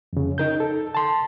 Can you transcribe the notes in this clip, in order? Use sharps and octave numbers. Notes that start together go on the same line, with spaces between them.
F2 C#3
D#4 A#4 G6
A4
A5 C6